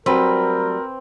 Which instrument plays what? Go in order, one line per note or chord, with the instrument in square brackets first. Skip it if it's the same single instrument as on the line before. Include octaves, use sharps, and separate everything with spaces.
[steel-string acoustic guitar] F#3 G3 A3 [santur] C4 [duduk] A#4 [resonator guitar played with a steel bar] B4